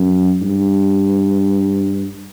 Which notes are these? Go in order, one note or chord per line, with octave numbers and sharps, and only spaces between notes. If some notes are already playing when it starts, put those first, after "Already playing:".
Already playing: F#2
G2